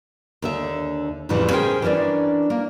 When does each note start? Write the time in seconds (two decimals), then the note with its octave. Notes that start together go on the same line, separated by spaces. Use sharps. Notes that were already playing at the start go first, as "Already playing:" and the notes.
0.42 D#2 D3 E5
1.29 F2 A2 C#3 E3 F3 G3
1.51 C#4 G#4 A#4 C5 G5
1.82 E3 C#4 D4 A#4 D5
2.50 A#3